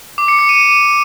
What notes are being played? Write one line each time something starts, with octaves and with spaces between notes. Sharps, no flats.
D6
C#7
C#7
D#7